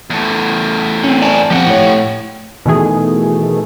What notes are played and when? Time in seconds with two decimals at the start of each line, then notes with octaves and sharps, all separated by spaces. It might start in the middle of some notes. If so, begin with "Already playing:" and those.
0.10 E2 A3
1.04 C4 C#4
1.22 D5 G#5 A5
1.50 F3 A#3 C4 G4 F#5
1.67 A2 C#5
2.66 B2 D#3 E3 A3 G#4